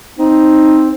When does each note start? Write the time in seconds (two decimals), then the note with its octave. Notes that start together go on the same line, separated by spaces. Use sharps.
0.19 C4 D#4